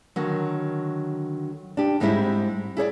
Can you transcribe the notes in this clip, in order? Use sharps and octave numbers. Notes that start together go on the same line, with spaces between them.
D3 D#3 F#3
D4 G4
G#2 G3 G#3 C4 D#4 E4
E4 G#4 C#5 D5